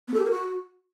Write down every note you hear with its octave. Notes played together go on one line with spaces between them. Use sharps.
B3
A4
G4
A#4
F#4